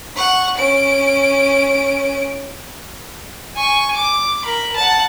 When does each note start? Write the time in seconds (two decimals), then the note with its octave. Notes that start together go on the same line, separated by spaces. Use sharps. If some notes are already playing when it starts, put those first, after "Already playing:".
0.16 F#5 C#6
0.58 C#4 D7
3.56 G#5 C#6
3.96 D6
4.45 A#4 B5
4.75 F#5 A5